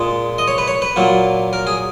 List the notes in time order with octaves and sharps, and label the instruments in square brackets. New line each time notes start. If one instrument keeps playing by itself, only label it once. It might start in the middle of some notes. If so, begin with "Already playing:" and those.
Already playing: [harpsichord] A#2 G#3
D#5
C#5
B4
C#5
B4
A#2 F#3 A#3
A#4
G#4